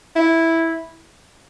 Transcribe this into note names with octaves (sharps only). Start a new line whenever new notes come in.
E4